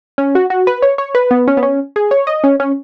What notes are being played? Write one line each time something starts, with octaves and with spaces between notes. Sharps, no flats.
C#4
F#4
F#4
B4
C#5
C#5
B4
B3
C#4
B3
C#4
G#4
C#5
D#5
C#4
C#4